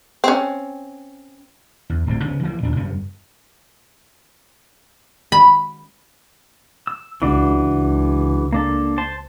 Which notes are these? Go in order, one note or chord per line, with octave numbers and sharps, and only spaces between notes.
C4 C#4
E2
D1 A1 G2 C4
C#3 B3
E3 F3 G#3 A#3
D#2 A#2 D4
F#2 C#3 G3 B3
B5
E6
C#2 E3 D4 F#4
C#2
A#3 D4 A4
C5 A5 C6